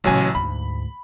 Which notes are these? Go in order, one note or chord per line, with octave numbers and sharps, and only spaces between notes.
A1 A#2 C#3 F#3 G#5
D2 G#2 B5